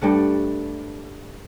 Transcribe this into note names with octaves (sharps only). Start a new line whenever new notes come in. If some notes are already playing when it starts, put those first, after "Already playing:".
G2 G3 A3 F#5